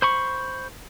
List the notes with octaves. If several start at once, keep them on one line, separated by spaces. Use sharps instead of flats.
C5 B5 C#6